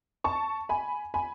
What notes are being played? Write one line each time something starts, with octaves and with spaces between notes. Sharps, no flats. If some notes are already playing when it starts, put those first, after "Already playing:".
A5 C#6
G#5 B5
G#5 B5